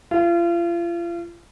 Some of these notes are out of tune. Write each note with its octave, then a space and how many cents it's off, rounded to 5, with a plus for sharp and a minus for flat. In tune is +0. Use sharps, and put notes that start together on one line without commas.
F4 -35